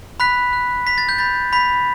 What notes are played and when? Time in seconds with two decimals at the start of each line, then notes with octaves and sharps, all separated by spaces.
0.20 B5 F#6 B6
0.53 F#6
0.87 B5 B6
0.98 A6
1.09 G6
1.18 B5 A6
1.53 B5 G6 B6